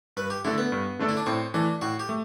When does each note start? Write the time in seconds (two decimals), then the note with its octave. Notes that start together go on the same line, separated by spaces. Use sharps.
0.17 G2 B4
0.30 G4
0.45 D3 A3 D4 E4 A4
0.58 B3
0.72 G2
0.99 D3 A3 D4 A4
1.09 E4
1.17 D4
1.26 A2 C4
1.54 E3 A3 D4
1.81 A2 F#4
1.99 G4
2.09 A3